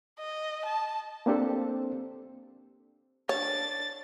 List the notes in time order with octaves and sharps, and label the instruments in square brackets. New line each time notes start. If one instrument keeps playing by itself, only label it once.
[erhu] D#5
A5
[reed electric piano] A#3 C4 D4 G4 A4 C5
[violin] D4 A6 [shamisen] C#5